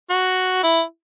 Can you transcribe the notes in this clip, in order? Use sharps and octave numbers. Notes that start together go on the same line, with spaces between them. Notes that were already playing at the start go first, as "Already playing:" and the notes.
F#4
E4